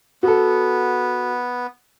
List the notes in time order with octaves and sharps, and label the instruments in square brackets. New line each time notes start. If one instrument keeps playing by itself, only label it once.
[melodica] B3 [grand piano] F#4 A4